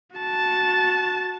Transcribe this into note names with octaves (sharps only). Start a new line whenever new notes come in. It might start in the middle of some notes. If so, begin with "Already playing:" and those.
F#4 A5